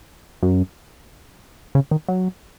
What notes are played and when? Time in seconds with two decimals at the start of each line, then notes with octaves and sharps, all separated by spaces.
0.43 F#2
1.75 C#3
1.91 D#3
2.09 F#3